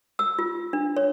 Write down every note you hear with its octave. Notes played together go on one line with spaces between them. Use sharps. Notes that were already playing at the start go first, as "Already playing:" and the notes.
E6
F4
D4
C#5